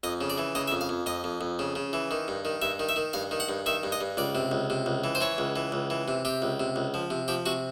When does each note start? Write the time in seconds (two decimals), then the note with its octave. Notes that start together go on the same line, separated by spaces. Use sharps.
0.03 F2 D#5
0.21 C#3
0.30 D5
0.38 E3
0.55 C#3 D#5
0.68 E5
0.72 F2
0.81 F5
0.89 F2
1.06 F2 D#5
1.24 F2
1.41 F2
1.59 C#3
1.75 C#3
1.93 E3
2.11 D#3
2.28 G2
2.45 D#3
2.62 G2 E5
2.79 D#3
2.89 E5
2.96 D#3
3.13 G2 F5
3.31 D#3
3.40 F#5
3.49 G2
3.66 D#3 E5
3.83 G2
3.92 D#5
4.01 G2
4.17 C#2 D5
4.35 C3
4.51 C#2
4.70 C3
4.86 C#2
5.04 E3
5.15 C5
5.21 E3 C#5
5.38 C#2
5.56 E3
5.72 C#2
5.90 E3
6.08 C3
6.25 C3 G4
6.42 C#2
6.60 C3
6.76 C#2
6.94 F3
7.10 C3
7.28 F3 G4
7.46 C3 F#4